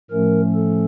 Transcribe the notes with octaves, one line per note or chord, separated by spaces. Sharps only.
A2 F3 A3 C#4 A#4
A4